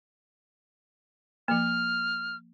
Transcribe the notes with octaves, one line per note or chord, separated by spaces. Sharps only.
F3 A#3 F6